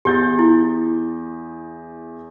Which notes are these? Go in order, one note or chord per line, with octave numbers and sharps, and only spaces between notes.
E2 G4 G6 A6
E4